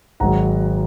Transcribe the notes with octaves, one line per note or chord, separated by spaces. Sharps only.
G#1 G#2 F#3 F#5 A#5